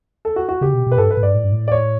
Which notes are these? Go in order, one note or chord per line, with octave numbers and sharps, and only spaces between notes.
A4
F#4
F#4
C#3 G4
B2
B2 B4
G2 A4
B4
A2
G2 D5
A2
G2
A2
D5
C#5